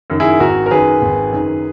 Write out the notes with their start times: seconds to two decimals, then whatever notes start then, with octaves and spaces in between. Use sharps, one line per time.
0.10 F#2 D#3
0.20 E4 G#4
0.40 G#1 F#4 A#4
0.66 A#4
0.71 F#2 D#3 G#4 B4
1.02 G#1
1.32 F#2 D#3